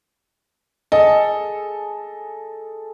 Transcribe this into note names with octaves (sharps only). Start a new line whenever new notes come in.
G#4 A4 D#5